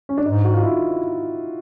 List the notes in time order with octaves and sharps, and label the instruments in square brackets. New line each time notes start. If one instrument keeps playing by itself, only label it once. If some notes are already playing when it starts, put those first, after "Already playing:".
[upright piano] C#4
D4
[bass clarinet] G#2 [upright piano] D#4
[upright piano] F#4
F4
E4